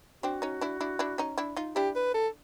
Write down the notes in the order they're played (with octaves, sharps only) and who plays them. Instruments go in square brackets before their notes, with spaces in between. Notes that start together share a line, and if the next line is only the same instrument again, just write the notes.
[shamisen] C4 D4 [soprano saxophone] F#4
[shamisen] C#4 D#4
D4 E4
D4 E4
D4 E4
C#4 D#4
D4 E4
D#4 F4
[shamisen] D4 E4 [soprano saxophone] G4
[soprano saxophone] B4
A4